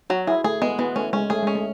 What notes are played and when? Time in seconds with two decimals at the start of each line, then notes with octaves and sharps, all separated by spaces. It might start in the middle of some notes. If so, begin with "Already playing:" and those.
0.10 F#3 F#4
0.27 E4 G#4
0.44 A3 G#4
0.62 G#3 B3
0.79 E3 B3
0.96 A3 C#4
1.13 G#3 C#4
1.30 A3 G#4
1.43 G#3 C#4
1.55 A3